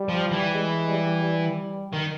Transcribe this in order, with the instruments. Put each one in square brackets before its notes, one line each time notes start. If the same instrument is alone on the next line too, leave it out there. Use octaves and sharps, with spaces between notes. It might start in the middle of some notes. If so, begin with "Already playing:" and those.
Already playing: [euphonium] G3
[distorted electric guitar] F3
E3
[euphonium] G#3
G3
G3
[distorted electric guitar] D#3